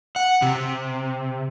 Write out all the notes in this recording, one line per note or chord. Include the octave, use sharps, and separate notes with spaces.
F#5
C3